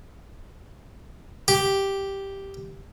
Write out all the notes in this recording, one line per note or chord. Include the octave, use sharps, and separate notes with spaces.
G4